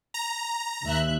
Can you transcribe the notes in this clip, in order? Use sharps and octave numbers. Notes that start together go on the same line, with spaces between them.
A#5
D#2 E5 F#6